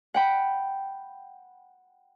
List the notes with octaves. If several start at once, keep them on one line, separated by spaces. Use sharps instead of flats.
F#5 G5 B5